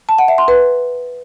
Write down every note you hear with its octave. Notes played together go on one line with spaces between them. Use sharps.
A5
F#5
E5
C6
B4